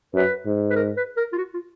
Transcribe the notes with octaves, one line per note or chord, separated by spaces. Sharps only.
F#2 B4
G#2
B4
A#4
B4
A#4
F4
F#4
F4